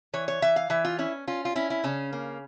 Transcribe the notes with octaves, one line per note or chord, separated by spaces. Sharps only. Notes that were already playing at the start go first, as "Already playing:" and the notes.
E3 C#5
C#5
E3 E5
F5
E3 E5
F4
C#4 E4
C#4 F4
F4
C#4 E4
E4
C#3 C#4
A#3